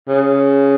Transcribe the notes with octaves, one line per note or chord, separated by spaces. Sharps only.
C#3